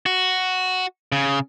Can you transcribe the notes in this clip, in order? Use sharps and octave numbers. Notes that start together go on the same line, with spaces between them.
F#4
C#3